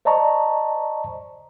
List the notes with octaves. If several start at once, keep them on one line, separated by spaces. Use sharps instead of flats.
C5 D5 D#5 A5 A#5 C#6